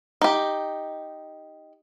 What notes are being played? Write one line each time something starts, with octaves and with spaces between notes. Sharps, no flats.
D#4 G4